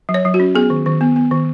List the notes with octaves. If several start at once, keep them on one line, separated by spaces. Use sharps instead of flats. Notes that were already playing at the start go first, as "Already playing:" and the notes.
F#3
C#5
F#3
F#4
C#4
B3 G#4
D#3
D#3
B3
B3
D#3